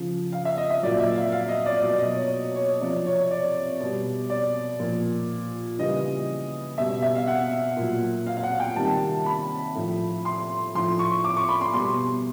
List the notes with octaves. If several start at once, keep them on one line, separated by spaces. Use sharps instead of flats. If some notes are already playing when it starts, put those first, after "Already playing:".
Already playing: C#3 F3
F5
E5
D#5
E5
A#2 F#3 D5
E5
F5
F5
D#5
D5
B2 F#3 D5
D#5
C#5
C#5
C3 F3 D5
C#5
D5
B2 G3
D5
A#2 F3
C#3 E3 G3 D#5
B2 G3 E5
E5
F5
F#5
A#2 F#3
F5
F5
F#5
G5
C3 D#3 G3 A5
B5
A2 F3
C6
A2 F3 C6
C#6
D6
C#6
B5
C6
B2 G3 C6